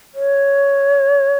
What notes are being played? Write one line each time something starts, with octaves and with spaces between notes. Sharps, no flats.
C#5